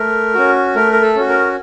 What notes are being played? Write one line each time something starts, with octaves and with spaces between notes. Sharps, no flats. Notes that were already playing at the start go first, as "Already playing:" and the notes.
Already playing: A3 A#4
C#4 F#4
A3 A#4
A#4
A4
C#4 F#4
A#4